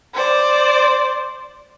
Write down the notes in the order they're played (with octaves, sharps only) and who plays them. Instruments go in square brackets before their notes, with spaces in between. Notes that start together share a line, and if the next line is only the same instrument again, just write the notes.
[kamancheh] C5 D5